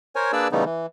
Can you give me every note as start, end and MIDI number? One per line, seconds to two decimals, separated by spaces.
0.16 0.32 70
0.16 0.32 72
0.16 0.32 73
0.16 0.32 80
0.33 0.48 58
0.33 0.48 62
0.33 0.48 68
0.33 0.48 71
0.33 0.48 74
0.33 0.48 88
0.52 0.64 49
0.52 0.64 52
0.52 0.64 55
0.52 0.64 57
0.52 0.64 59
0.52 0.64 63
0.65 0.86 52